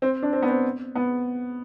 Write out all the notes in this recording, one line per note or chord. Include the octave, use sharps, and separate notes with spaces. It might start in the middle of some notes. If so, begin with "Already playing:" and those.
C4
D4
C4
B3
C4
B3